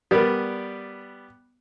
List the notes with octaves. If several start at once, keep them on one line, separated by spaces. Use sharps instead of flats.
G3 B3 A#4 B4 D5